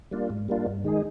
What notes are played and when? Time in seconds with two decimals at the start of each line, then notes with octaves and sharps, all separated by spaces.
0.11 G3 A#3 D4 F4
0.30 G#2
0.48 G3 A#3 D4 F4
0.67 G2
0.84 D#3 G#3 D#4 G#4